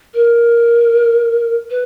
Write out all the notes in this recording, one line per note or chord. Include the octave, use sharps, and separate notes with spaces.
A#4
B4